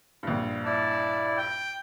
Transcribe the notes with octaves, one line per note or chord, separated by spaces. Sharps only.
A#1 G2
E4 D5 A5
G5